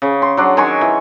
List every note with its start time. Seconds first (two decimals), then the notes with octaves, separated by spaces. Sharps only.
0.02 C#3
0.22 C6
0.37 F#3 D4
0.57 D#3 G#5 C6 C#6
0.81 E3